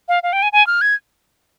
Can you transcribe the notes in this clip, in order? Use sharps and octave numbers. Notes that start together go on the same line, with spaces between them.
F5
F5
G5
G#5
G#5
F6
G#6